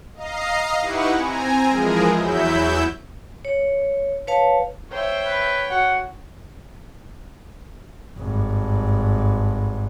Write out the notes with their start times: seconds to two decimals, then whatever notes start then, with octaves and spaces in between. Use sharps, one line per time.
0.15 D#5 F5 A#5 C7
0.80 D#4 E4 G4 B4 F#5 C#6
1.14 C4 G#5 A#5
1.68 E3 F3 G#3 G#4 A#4
2.13 E2 F#3 E4 E5 G6
3.45 C#5
4.27 B4 C#5 F5 A5
4.91 C5 C#5 E5 G5
5.26 B4
5.70 F#4 F#5
8.19 G#1 G2